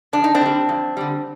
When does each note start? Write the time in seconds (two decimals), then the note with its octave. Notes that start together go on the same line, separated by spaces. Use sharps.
0.13 F2 D4
0.24 D#4
0.35 C4 D4
0.41 D3
0.46 G3
0.69 F2
0.97 D3 G3